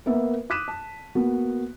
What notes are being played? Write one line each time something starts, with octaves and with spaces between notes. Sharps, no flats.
A#3 B3 A#4 B4 E5
D6 D#6 F#6 B6 D#7 E7
A5
A#3 B3 F#4